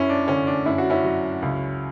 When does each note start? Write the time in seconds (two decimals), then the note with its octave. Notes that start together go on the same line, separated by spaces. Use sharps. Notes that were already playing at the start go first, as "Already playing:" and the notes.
Already playing: F#2 C#4 E4
0.09 D4
0.28 D3 C#4
0.47 D4
0.66 F#2 E4
0.78 F#4
0.90 C#4 E4
1.04 F#3
1.42 C#2